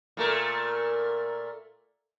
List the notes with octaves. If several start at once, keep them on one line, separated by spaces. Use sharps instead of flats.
A#2 A3 A#4